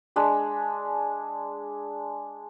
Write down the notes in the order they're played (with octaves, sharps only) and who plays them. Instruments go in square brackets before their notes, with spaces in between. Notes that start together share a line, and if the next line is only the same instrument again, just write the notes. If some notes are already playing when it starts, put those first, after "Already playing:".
[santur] G#3 D4 B5